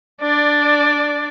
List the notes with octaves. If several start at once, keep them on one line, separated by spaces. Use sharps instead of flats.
D4 D5